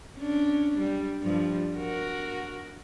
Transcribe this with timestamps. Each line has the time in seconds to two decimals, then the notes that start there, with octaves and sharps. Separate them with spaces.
0.18 C#4 D4
0.79 G3
1.22 G2 F3 G3
1.76 F#4 A#4